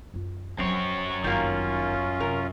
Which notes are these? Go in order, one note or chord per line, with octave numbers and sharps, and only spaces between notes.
F#2 F4
F#2 F3 F#3 C4 C#5
G1 D#3 A#3 C#4 F4
C3 A#4